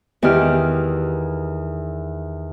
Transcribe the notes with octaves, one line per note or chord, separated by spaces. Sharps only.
E2 D#3 E3 G4 F6